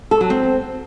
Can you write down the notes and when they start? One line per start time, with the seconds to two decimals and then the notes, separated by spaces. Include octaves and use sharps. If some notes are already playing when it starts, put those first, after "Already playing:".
0.11 A4
0.21 F#3
0.30 C4